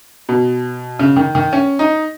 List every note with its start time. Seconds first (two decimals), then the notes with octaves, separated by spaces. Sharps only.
0.29 B2
0.99 C#3
1.16 D#3
1.35 D#3
1.53 C#4
1.79 D#4